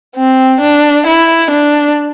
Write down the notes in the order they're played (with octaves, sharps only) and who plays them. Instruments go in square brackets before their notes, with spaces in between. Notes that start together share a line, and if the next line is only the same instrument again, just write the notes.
[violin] C4
D4
E4
D4